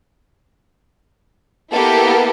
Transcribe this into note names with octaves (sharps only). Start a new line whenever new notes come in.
A#3 B3 E4 G4 A4 A#4